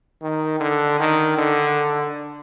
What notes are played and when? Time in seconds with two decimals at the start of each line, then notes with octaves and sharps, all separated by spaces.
0.22 D#3
0.60 D3
1.00 D#3
1.38 D3